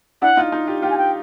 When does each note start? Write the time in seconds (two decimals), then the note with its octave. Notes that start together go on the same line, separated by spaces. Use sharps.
0.22 D4 E4 F#5
0.37 D#4 F4
0.52 D#4 F4
0.67 F4 G4
0.82 F4 G4 G5
0.90 G#5
0.98 G5